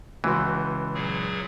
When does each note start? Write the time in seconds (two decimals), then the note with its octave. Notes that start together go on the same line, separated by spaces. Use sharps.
0.24 C#2 E3 F#4 C6
0.94 A#2 F#3 G#4